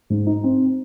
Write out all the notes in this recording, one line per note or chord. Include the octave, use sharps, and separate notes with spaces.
G#2
D#4
C4